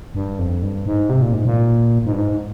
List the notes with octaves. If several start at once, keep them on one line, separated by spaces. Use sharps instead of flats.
G2
F2
G2
G#2
C3
A#2
G#2
A#2
G#2
G2
G#2